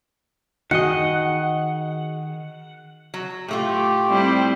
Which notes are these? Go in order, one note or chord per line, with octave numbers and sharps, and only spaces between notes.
D#3 F#4 G#4 D#5 F#5 C#7
F#3
A2 A3 F4 G4
G3 C4 E4